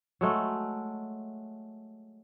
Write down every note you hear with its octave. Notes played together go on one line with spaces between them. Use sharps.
F#3 G#3 A3